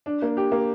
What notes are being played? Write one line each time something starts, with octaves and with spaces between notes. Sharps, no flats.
D4
A#3
G4
A#3